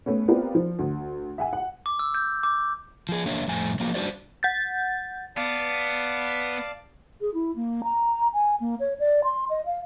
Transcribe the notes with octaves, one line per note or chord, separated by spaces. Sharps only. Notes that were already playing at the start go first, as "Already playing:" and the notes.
A3 B3 C#4
B3 C4 F4 G4 A#4 D5
F3
D2
E5 F#5 G#5
F#5
D6
E6
G6
D6
F3 G#4
E2 A#3 D4 C#5 E5
F2 A2 G#5
F3 F#3 A#3
G3 D4 F#4 C5 D5
F#5 G6 A6
B3 D5 F5 A5
G#4
E4
A#3
A#5
G#5
A#3
C#5
D5
C6
D#5
F5